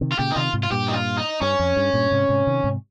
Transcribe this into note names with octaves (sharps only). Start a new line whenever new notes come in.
C3 D#3
F4
A#2 C#3 G4
D#4
C3 D#3 F4
G#2 C3
F4
G2 A#2 G4
D#4
F4
D#4
G2 C#4
F2
G2
G2 A#2
G#2 C3
G#2 C3
C3 D#3
G#2 C3